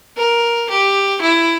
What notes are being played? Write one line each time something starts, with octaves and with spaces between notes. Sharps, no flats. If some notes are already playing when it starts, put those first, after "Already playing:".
A#4
G4
E4